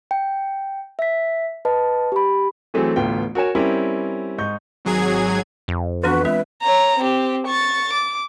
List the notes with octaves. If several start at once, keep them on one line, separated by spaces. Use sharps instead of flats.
G5
E5 B6
B4 D#5 A5
G4 B5
E3 F#3 A3 C4 G#4 A4
A1 D2 A3 B3 F4 G5
F#4 A#4 C#5 G#5 E7
G3 C4 C#4 E4 G4 A#4
G#2 D#4 C#6 G6
G#1 F#3 G#4 G#6
F2
E3 B3 D4 F#4 B4
G#3 C4 F4 E5
C#5 A#5
C4 G4
C#6 A6
D6